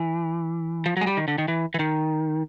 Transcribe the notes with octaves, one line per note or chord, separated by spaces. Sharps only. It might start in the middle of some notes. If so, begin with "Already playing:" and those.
Already playing: E3
F3
F#3 G#3
G3
D#3
D3
D#3
E3
E3
D#3